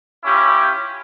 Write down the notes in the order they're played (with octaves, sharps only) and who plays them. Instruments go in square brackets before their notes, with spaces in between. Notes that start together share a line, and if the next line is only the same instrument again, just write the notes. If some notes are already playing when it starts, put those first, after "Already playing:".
[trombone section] C#4 E4 F4 G4